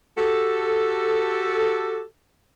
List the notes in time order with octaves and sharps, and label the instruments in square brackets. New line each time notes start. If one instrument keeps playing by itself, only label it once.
[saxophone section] F#4 G4 A4